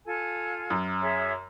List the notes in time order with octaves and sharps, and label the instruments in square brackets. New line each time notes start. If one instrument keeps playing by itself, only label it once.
[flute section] F4 A4 G#5
[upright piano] F#2
[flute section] G#4 C#5 E5